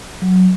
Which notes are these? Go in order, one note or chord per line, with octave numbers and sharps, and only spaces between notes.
F#3